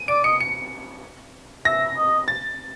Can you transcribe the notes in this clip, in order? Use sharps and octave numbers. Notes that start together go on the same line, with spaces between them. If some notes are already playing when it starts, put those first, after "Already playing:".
Already playing: D#7
D5 D7
D#5 C#7
C#7
E5 A#6
D#5
A6